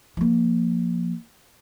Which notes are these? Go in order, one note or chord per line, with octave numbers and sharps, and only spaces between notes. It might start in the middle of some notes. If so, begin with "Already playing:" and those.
F3 A#3